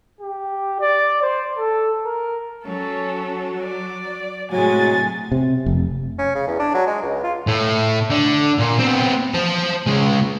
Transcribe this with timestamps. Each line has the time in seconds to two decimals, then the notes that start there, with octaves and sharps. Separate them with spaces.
0.21 G4
0.80 D5
1.22 C5
1.58 A4
2.06 A#4
2.66 F#3 C#4 A4
3.63 D5
4.52 A2 C3 F#3 G#3 G#5 A6
5.32 C3
5.66 F1
6.19 C#4
6.35 C#3
6.47 E2
6.59 D4
6.74 F#3
6.87 G#3
7.02 C#2
7.24 F4
7.47 A2
8.11 D3
8.59 A#2
8.79 B3 C4
9.34 C5 A5
9.87 C#3 G#3